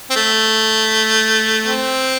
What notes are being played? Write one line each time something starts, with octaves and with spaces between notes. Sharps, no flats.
C4
A3
C4